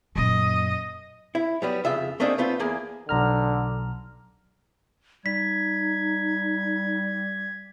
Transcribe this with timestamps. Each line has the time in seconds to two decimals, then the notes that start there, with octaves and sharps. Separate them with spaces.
0.16 F#2 A#2 D#5
1.35 E4
1.62 F#3 G3 B3
1.85 F2 C#3 F4 E5
2.20 A3 A#3 C4 D4 D#4 G#4
2.38 A3 B3 C4 F4
2.60 E2 A#3 G#4
3.09 B1 D3 A#5 F6
5.26 G3 D#4 G#6 B6